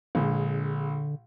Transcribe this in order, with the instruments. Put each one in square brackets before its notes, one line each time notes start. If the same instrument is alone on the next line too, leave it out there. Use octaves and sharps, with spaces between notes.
[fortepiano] A#1 G#3 [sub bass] D3